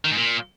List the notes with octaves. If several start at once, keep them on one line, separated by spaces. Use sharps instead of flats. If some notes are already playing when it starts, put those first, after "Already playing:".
D#3
G#2
A#2